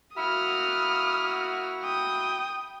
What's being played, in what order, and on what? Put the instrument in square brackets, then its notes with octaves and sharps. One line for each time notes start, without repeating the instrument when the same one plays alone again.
[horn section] A#3 E4 F#4 [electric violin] D#6 F6
[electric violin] G5 D#6